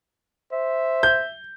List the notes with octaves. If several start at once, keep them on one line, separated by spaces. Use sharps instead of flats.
C5 E5
G6